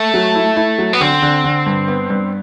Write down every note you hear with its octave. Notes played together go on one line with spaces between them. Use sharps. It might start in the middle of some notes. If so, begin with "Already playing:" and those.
Already playing: A3
F#3
E4
E4
F#3
B3
D3 C4
D3
D3
G2
B3
G2